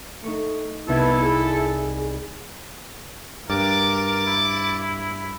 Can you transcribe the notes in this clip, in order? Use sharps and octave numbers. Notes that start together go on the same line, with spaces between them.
A3 D#4 C#6
C2 B3 D#4 E4 A4 G#6
G#4
G2 A#4 D6 A6
E4